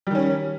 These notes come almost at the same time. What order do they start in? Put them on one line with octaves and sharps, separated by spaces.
G3 D#3 C#4